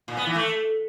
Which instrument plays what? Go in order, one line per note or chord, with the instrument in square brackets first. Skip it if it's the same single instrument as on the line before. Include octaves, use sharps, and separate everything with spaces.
[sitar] A#2
B3
E3
A3